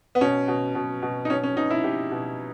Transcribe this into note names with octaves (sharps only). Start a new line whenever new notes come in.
B3
B2 C#4
B2
B2
B2
D#4
B2 C#4
C#4
B2 D#4
E4
B2 G4
B2